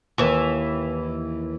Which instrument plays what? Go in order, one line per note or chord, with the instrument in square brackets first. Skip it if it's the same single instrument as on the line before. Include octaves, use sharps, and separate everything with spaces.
[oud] D#2 E3